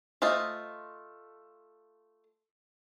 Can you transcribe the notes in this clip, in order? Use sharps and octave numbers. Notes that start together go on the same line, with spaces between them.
A3 F4 C5 D#5